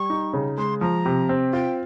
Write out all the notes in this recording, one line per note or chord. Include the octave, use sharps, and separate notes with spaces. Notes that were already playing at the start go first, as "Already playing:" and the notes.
Already playing: G3 C#6
D#4
C#3
G#3 C6
F3 A#5
C3
C4
F4 G5